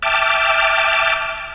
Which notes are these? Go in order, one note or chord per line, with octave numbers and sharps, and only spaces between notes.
E5 G5 A5 D6 F6